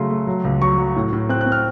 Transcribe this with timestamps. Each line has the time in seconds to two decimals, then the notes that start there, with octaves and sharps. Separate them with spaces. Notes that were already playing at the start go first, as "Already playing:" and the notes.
Already playing: C#3 F#3 A3 C6
0.10 A3
0.27 F#3
0.44 C#2
0.61 F#3 C#6
0.78 F#3
0.96 A2
1.13 A2
1.29 C4 F#6
1.41 F#6
1.46 C4
1.52 F6